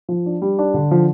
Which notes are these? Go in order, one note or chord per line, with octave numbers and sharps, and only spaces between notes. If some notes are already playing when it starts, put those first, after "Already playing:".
F3
D4
G3
D4
D3
F3